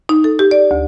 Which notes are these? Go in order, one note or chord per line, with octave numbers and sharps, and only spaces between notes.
D#4
A4
G4
D5
D2